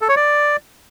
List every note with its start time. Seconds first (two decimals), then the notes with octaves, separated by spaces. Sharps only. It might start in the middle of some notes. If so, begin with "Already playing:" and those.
0.01 A4
0.09 C#5
0.16 D5